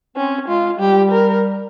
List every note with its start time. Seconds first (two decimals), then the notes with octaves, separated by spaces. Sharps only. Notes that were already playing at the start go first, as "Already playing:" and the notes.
0.17 C4 C#4
0.48 G#3 F4
0.79 G3 G4
1.11 A#4